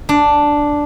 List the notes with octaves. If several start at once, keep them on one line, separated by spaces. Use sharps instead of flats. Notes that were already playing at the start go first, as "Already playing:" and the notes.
D4